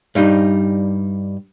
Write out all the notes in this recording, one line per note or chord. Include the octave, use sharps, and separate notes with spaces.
G2 G3 D#4